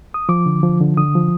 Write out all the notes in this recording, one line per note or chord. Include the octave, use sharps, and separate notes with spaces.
D#6
F3 D6
D3
F3
D3
D3 D#6
F3